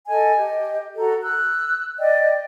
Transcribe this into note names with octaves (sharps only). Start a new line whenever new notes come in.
A4 D#5 G#5
G4 D#5
F#4 A4 A#5
E6 F#6
D5 D#5 G5